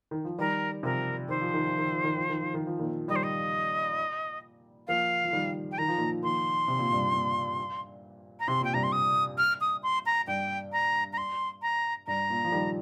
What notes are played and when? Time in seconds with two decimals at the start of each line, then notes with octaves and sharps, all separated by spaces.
0.11 D#3
0.25 F3
0.39 D#3 G3 A#4
0.83 C3 F3 A#4
1.29 D#3 C5
1.41 F3
1.54 D#3
1.67 F3
1.78 D#3
1.91 F3
2.04 D#3
2.17 F3
2.29 D#3
2.41 F3
2.54 D#3
2.67 F3
2.79 A#2 D#3
3.08 D#3 G3 D#5
3.16 C5
3.23 D#5
4.88 F3 A#3 F5
5.24 F3
5.32 D#3 G3
5.72 G5
5.78 D#3 A#5
5.88 F3
5.98 A#2 D#3
6.23 A#2 D#3 C6
6.68 C3
6.79 A#2
6.91 G2 C3
7.13 A#2
8.40 A#5
8.48 C3 C6
8.61 A#2 G5
8.74 G2 C3 A#5
8.83 C6
8.92 D#6
9.38 F6
9.61 D#6
9.83 C6
10.06 A#5
10.27 G2 G5
10.72 A#5
11.13 A#5
11.18 C6
11.62 A#5
12.07 G2 A#5
12.30 A#2
12.45 F3
12.52 D#3 G3